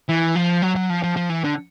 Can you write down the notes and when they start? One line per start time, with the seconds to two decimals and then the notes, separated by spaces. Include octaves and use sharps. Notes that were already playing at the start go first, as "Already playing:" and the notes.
0.09 E3
0.35 F3
0.62 F#3
0.76 F#3
0.90 F3
1.03 F3
1.17 F3
1.30 E3
1.44 D3